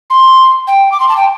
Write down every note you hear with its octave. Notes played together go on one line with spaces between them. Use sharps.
C6
G5
D6
C6
A5
G5